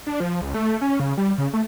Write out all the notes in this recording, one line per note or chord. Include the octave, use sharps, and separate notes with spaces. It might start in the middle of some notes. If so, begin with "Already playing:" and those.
D4
F3
C#2
A3
C#4
C#3
G3
C#3
A3